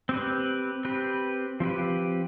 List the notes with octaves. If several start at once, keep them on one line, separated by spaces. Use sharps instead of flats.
C4 G4 B4
C4 G4 B4
F3 C4 G4 B4